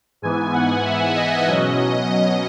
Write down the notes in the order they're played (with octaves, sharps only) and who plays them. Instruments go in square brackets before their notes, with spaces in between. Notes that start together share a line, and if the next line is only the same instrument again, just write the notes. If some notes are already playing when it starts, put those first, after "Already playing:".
[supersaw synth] G#2 E3 B3 G#5
F#5
E5
D#5
B2 F#3 C#4